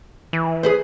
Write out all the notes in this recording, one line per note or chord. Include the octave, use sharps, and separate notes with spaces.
E3
G#4 B4 C5